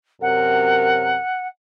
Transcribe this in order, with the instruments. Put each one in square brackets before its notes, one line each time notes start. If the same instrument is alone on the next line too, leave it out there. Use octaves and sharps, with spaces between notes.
[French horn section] F#2 C3 A#4 [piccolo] F#5